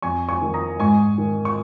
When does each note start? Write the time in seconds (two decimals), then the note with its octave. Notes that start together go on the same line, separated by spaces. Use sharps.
0.02 F2 G#5 C#6
0.29 G#5 C#6
0.42 D#3
0.54 A#5 D#6
0.79 G#2 G#5 C#6
1.18 D#3
1.45 C#6